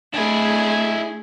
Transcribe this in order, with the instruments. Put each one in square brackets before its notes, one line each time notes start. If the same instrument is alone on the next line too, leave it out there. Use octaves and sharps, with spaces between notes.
[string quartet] A3 [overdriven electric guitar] D4 E4 [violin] G#4